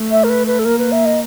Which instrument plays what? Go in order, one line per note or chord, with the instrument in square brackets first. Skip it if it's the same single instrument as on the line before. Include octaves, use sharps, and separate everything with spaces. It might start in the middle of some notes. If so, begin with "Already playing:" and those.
Already playing: [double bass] A3
[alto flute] E5
A#4
B4
B4
A4
[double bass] A#3 [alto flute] A#4
[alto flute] B4
E5
D#5